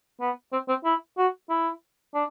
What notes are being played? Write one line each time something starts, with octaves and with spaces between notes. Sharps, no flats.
B3
C4
C4
E4
F#4
E4
D4